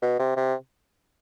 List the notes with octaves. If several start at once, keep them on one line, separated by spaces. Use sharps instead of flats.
B2
C3
C3